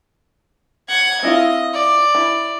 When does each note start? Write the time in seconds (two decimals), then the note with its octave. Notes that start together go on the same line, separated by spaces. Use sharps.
0.89 F#5 G#6
1.23 C4 E4 F4 D#5
1.74 D5
2.15 E4